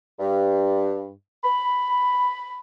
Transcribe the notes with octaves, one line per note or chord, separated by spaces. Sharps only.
G2
B5